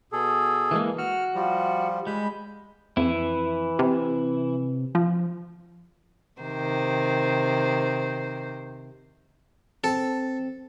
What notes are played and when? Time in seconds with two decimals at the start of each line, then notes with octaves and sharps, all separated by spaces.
0.12 B2 G#4 A4
0.71 E3 G#3 A#3
0.98 F#4 F6
1.35 F3 G3
2.07 G3 G#3 B5 G6
2.97 F2 E3 E4
3.79 C3
4.95 F3
6.41 C3 D#3 C5
9.84 C4 A4